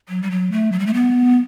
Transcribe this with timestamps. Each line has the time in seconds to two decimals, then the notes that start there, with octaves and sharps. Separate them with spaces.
0.09 F#3
0.22 G3
0.31 F#3
0.52 A3
0.72 F#3
0.79 G3
0.87 A3
0.94 B3